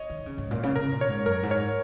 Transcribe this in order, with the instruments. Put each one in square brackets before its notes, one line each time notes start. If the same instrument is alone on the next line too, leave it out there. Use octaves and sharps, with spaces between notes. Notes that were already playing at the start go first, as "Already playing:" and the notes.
Already playing: [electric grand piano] C#5 D#5
[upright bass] D#3
C#3
G#2
A#2
C#3
[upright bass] C#3 [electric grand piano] A#4
[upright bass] A#2
[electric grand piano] C#5
[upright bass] G#2
[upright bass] F#2 [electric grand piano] A#4
[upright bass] G#2
[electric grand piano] C#5